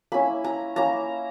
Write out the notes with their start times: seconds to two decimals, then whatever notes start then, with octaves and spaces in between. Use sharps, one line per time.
0.12 A#3 C#4 E4 B5
0.44 A#5
0.76 A#3 C#4 E4 A#5